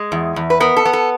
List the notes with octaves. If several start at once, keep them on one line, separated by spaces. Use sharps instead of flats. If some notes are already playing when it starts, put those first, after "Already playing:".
Already playing: G#3
E2
E2
B4
B3 A#4
A4
B3
A4